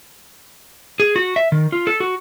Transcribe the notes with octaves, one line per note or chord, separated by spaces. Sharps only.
G#4
F#4
E5
D#3
F4
A4
F#4